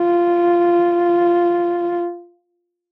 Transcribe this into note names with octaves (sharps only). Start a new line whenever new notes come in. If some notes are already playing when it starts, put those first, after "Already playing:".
Already playing: F4